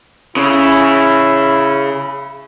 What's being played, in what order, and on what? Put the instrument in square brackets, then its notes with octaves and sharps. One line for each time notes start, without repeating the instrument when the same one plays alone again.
[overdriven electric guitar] C#3 [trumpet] E4